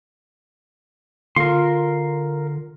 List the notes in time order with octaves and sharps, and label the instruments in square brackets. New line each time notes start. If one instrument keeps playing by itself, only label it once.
[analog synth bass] D3 [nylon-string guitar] F4 [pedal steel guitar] A#4 C6